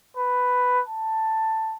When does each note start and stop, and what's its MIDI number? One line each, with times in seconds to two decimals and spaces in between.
0.17 0.81 71
0.88 1.77 81